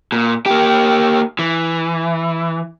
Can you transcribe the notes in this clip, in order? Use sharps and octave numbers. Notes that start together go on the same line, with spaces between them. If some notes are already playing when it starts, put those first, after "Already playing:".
A#2
A#3 G4
E3